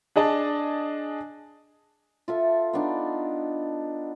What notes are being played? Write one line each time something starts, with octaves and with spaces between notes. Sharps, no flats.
D4 G#4 D#5 A5
F4 A4 E5
B3 D4 D#4